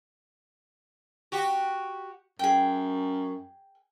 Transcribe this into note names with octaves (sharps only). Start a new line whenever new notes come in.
F#4 G4
F#2 G#4 G5